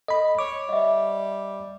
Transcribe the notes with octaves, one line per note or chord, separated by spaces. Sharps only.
A4 D#5 B5
C#5 D6
G3 D#5 E5